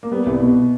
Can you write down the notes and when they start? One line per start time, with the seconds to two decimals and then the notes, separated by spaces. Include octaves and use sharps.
0.03 A#3
0.11 G3 B3
0.26 C2
0.41 B2